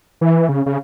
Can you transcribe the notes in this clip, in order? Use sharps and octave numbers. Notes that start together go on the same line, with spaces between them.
E3
C#3
C#3